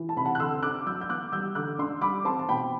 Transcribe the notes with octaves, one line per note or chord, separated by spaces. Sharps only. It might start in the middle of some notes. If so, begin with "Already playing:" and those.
Already playing: E3
A5
C3 B5
F#5 A5
F#6
D3 C6 E6
D4 D6 F#6
F#3 E6 G6
G6
B3 D6 F#6
G3 E6 G6
D3 D6 F#6
D4 C6 E6
G3 B5 D6
C4 A5 C6
A5
B2 G5 B5